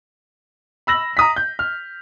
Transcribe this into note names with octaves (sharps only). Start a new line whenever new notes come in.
B5 E6 A#6 F#7
A#5 D#6 B6
G6
F6